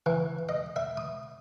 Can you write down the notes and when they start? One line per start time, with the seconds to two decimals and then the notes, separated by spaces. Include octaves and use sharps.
0.06 E3
0.49 D#5
0.76 E5
0.97 D#6